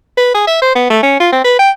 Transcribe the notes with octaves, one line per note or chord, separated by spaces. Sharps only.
B4
G#4
E5
C5
B3
A3
C#4
F4
C4
B4
G5